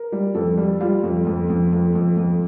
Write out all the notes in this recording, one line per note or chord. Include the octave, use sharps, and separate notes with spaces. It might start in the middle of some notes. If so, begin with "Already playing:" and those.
Already playing: A#4
G3
F2 A4
G3
G3 F4
F2
F2
F2
F2
F2
F2